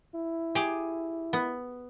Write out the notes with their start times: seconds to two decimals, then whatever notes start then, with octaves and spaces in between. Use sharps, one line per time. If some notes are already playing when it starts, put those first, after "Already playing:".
0.15 E4
0.55 G4 G#4
1.33 B3